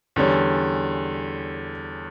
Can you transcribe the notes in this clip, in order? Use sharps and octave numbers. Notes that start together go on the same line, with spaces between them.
E2 D3 G3 C#4